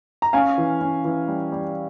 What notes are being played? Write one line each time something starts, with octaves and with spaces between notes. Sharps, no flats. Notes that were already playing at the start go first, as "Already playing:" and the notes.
A#5
C#4 F5 G#5
E3
C#4
E3
G3
G3